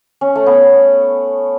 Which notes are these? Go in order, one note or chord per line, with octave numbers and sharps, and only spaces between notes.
C#4
A3
B3